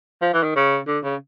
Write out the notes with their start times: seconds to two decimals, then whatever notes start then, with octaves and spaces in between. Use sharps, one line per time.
0.22 F3
0.33 E3
0.43 D#3
0.55 C#3
0.87 D3
1.04 C#3